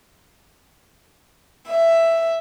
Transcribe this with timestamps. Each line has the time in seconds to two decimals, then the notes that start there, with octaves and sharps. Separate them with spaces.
1.69 E5